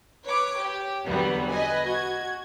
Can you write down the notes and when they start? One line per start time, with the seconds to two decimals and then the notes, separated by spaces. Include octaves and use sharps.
0.25 B4 C#5 D6
0.57 G4
1.07 E2 D3 E3 F#3 G3 B3
1.50 B4 D#5 G#5
1.85 F#4 G#6